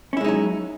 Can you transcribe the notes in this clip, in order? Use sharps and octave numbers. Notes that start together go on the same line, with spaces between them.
F#3 G#3 C#4 D#4 E4